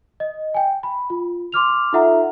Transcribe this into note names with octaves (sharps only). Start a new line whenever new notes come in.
D#5
G5 G#5
B5
F4
C6 D6 F6 F7
D#4 F4 A4 E5 F#5 A#5